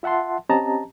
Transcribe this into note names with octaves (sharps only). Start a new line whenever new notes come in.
F4 E5 F#5 A5 C6
C4 C#4 G4 D#5 A5 A#5